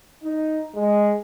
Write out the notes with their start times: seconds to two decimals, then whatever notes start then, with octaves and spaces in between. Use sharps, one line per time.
0.22 D#4
0.75 G#3